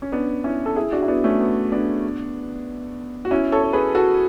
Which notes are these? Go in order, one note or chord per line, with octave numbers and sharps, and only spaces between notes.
C#4
B3 D4
C#4 E4
A4
E4 G#4
D4 F#4
E4
B3 D4
A3 C#4
B3
B3 D4
F#4
C#4 E4
A4 C#5
C#5
G#4 B4
F#4 A4